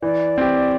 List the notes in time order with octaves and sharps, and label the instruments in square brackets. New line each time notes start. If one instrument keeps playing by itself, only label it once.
[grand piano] E3 [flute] D5
[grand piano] C4 G4